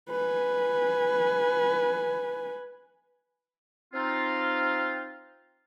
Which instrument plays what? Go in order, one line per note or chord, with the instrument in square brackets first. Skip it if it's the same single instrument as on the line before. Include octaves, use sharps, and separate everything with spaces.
[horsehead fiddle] B4 G#5
[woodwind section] C4 D#4 F4